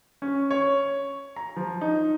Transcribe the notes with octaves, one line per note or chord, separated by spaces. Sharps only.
C#4
C#5
A#5
F3
D#4